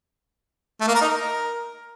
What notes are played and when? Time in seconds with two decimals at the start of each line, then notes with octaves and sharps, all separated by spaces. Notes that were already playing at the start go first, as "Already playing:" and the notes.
0.81 A3
0.88 A#3
0.95 A#4
1.02 D#4
1.08 A#4